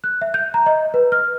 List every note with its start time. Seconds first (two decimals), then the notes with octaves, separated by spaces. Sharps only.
0.04 F#6
0.22 E5
0.34 G6
0.54 A#5
0.66 D#5
0.94 B4
1.12 F6